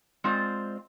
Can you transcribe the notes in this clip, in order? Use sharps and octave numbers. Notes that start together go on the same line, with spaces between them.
G#3 C4 F4 C5 D5